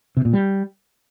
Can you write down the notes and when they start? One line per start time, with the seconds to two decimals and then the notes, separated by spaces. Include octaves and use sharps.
0.17 C3
0.25 A#2
0.33 G3